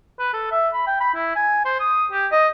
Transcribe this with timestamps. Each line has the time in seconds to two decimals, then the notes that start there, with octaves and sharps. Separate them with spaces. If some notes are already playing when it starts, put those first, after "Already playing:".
0.19 B4
0.33 A4
0.51 E5
0.74 B5
0.87 G5
1.01 B5
1.14 E4
1.36 G#5
1.65 C5
1.80 D#6
2.12 G4
2.32 D#5